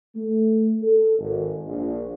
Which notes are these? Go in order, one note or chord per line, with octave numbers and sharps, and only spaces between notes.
A3
A4
G#1
A#1